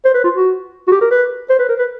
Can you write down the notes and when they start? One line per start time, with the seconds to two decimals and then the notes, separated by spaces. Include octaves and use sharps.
0.05 C5
0.14 B4
0.24 F4
0.34 F#4
0.88 F#4
0.92 G4
1.01 A#4
1.11 B4
1.50 C5
1.59 B4
1.69 A#4
1.79 B4